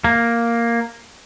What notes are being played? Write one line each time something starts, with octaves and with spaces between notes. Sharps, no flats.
A#3